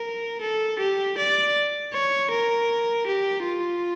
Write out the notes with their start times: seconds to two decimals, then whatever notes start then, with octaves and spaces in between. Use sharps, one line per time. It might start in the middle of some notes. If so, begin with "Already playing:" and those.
Already playing: A#4
0.41 A4
0.79 G4
1.18 D5
1.93 C#5
2.31 A#4
3.07 G4
3.44 F4